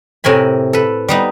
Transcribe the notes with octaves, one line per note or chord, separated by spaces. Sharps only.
A2 C3 A#4 G#5 B5
A4 B4
G3 B3 D#4